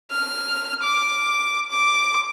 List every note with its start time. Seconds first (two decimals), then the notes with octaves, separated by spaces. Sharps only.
0.11 F6
0.83 D6
1.71 D6